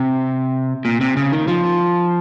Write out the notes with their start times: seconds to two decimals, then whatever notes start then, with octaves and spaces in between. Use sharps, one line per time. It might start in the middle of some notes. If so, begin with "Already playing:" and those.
Already playing: C3
0.85 A#2
1.01 C3
1.17 C#3
1.32 D#3
1.48 F3